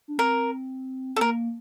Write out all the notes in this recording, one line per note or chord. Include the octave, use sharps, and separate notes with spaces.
D4
C4 A#4
C4 A4
A#3 A#4